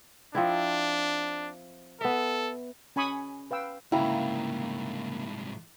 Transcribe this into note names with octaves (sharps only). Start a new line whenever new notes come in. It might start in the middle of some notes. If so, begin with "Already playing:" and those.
F3 C4 D4 E4
B3 A4 E5
C#4 G#5 B5 C#6 D#6
B4 F5 G5 E6
C2 G#2 C#3 A#3 E4 F5 G5 A#5